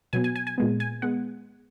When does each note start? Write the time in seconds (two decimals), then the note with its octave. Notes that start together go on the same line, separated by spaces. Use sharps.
0.13 B2 F#3 B3 G#5
0.24 G#5
0.36 G#5
0.47 G#5
0.58 A#2 G#3 B3
0.80 G#5
1.02 G#3 B3 F#5